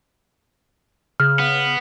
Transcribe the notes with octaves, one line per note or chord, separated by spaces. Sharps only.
C#3 F6
B3